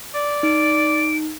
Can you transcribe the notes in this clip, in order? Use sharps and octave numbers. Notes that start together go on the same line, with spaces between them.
D5
D#4 D7